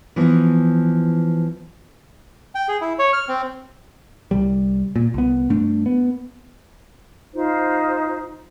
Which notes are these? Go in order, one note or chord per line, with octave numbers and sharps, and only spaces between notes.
E3 F3 B3
G5
G#4
E4
C#5
F6
C4
C2 G3
A#2
C2 B3
G2 A3 D4
B3
D#4 F4 C5